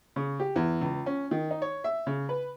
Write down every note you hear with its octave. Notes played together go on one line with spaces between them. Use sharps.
C#3
G4
E2
C#2
C#4
D#3
D#4
C#5
E5
C#3
B4